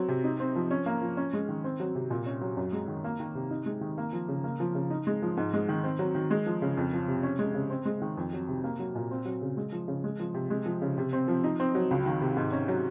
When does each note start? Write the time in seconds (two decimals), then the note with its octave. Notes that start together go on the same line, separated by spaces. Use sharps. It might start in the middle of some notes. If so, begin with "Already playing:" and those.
Already playing: F#3 C4
0.08 C3
0.24 D#4
0.40 C4
0.55 F3
0.71 C#4
0.86 A#3
1.02 F3
1.17 C#4
1.33 G#3
1.49 D#3
1.64 C4
1.80 F#3
1.95 C3
2.10 A#2
2.26 C#4
2.41 F#3
2.57 F#2
2.73 G#3
2.88 D#3
3.04 A#3
3.20 D#3
3.35 C3
3.51 D#4
3.66 G#3
3.81 D#3
3.98 A#3
4.13 F3
4.28 C#3
4.44 A#3
4.60 F3
4.75 C#3
4.90 D#4
5.07 G#3
5.22 F3
5.37 G#2
5.53 G#3
5.69 D#3
5.84 C4
5.99 F#3
6.15 D#3
6.31 G#3
6.46 F3
6.62 C#3
6.77 F2
6.93 F3
7.08 C3
7.23 C#4
7.39 G#3
7.54 C#3
7.70 C4
7.85 G#3
8.02 D#3
8.17 F2
8.33 F#3
8.48 C3
8.64 A#3
8.79 F#3
8.95 A#2
9.11 C4
9.25 F#3
9.42 C#3
9.57 G#3
9.72 F3
9.88 C#3
10.04 G#3
10.19 F3
10.34 C3
10.50 G#3
10.66 F3
10.82 C#3
10.98 C3
11.13 C4
11.28 F3
11.44 D#4
11.60 C4
11.75 F#3
11.91 C#2
12.06 D#3
12.21 C3
12.37 G#2
12.52 C#4
12.68 F#3